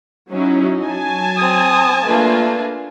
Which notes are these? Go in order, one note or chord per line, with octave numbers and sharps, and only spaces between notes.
F#3 C#4 D#4 E4
F#3 G#5 A5
C4 D#6
A3 A#3 D4 F4 B4